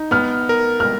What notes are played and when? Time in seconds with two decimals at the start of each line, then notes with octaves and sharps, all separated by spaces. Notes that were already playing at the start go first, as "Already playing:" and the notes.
Already playing: D#4
0.11 B3 F6
0.49 A#4
0.80 F6